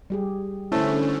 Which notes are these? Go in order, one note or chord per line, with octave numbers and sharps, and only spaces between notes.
G3 G4 G#4
D3 A3 C#4 E4 C5